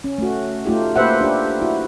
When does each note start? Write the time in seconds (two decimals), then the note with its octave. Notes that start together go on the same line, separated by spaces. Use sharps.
0.04 C#4
0.18 A3 F#4
0.66 A3 D#4 F4 G4
0.96 A#3 G4 B4 C5 E5 F#5
1.21 D4 G4
1.62 E4 F#4